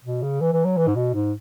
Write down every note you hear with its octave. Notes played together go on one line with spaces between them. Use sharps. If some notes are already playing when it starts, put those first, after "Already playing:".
B2
C#3
E3
E3
F#3
E3
G#2
B2
G#2